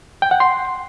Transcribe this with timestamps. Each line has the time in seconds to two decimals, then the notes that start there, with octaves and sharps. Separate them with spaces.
0.22 G5
0.31 F#5
0.40 C6